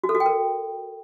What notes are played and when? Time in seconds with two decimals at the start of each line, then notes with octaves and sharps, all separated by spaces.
0.04 F#4
0.09 A4
0.15 F#4
0.20 G5
0.26 A#4